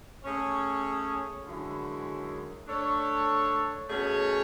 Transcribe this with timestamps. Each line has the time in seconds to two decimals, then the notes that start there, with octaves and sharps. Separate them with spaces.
0.24 A3 C#4 G#4 C#5
1.45 F#2 D3 G#3 C#4 E4
2.67 A3 D4 A4 C#5
3.89 B2 A3 C#4 G#4 C#5